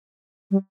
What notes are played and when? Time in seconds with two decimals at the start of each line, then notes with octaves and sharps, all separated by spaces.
0.51 G3